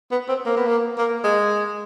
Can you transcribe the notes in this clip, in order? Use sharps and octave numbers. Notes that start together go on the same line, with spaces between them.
B3
C4
A#3
B3
A#3
A#3
G#3